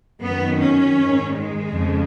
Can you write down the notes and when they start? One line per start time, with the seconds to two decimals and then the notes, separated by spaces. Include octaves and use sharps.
0.23 F#2 D#3 B3
0.60 C#4
0.97 G#2 D#3
1.33 G#3
1.69 F2 C#3